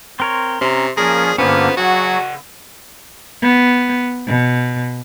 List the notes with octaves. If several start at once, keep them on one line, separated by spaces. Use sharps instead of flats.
C4 A#4 C#5 C6
C3 C#4 A#5
A#2 F3 C#4 G#4 A#4
G2 D3 A#3 B3 C#4 F4 G#4 C5
C#3 F#3 F#4 G#4 F#5
B3
B2